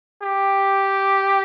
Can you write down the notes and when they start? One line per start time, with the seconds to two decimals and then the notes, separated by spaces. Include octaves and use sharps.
0.22 G4